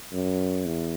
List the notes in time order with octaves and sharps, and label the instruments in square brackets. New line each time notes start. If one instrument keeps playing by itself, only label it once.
[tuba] F#2
E2